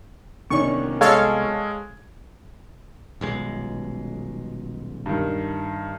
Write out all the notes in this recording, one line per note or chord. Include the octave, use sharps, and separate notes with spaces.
C2 C3 D#3 B3 C#4 D4 C#6
G#3 A4 C#5 F5 G#6
D#1 B1 G#3
G2 D#3